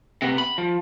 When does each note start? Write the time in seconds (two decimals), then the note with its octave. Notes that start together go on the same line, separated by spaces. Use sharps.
0.22 C3 B3
0.38 B5
0.58 F3